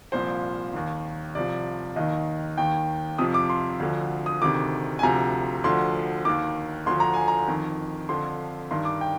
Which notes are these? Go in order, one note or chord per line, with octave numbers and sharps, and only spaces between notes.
C2 A#2 F3 C5
D#2 D#3
C2 C3 F3 D5
D#2 D#3 D#5
D#2 D#3 G5
F2 C3 F3 D#6
D6
C6
D2 D3 F3
D#6
D2 C3 D#3 D6
G#5
D2 C3 F3 A#5
D2 D3 F3 C6
D#2 D#3 D6
D2 D3 F3 C6
A#5
G#5
A#5
F2 D#3
F2 D3 F3 C6
G2 D#3 C6
D6
G5